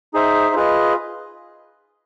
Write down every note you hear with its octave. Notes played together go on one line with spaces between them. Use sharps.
D#4 G#4 C5 E5
F4 G#4 B4 D#5